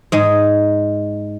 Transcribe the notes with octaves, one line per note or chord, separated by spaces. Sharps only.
G#2 G#3